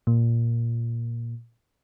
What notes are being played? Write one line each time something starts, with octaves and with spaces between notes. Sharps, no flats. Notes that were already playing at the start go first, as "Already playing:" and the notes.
A#2